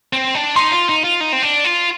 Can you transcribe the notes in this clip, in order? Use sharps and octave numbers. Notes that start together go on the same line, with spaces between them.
C4
D4
D#4 C6
F4
D#4
F4
D#4
C4
D4
F4